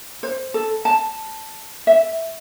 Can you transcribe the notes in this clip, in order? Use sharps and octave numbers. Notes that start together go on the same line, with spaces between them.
C5
A4
A5
E5